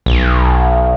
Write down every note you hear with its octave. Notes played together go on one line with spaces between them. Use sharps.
B1